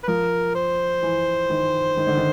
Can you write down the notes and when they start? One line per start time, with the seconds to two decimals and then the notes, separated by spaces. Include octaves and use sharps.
0.04 B4
0.08 F3 A#4
0.55 C5
1.03 E3
1.50 D#3
1.97 D#3
2.07 D3
2.17 D#3